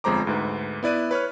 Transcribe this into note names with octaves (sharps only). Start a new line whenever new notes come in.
G1 F2 G#3 C5 A#5 D6
D2 G#2 B4
B3 E4 D5 F#6 D#7
B4 C#5 C#6 F6